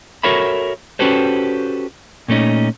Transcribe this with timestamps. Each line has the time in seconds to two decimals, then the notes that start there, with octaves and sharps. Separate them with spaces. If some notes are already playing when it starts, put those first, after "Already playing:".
0.23 F#4 A4 A#4 C#5 E5 B5
0.99 C#4 F#4 G4 A4 B4 C5
2.28 A#2 A3 C#4 D#4